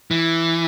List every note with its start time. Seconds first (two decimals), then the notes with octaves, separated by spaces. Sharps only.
0.11 E3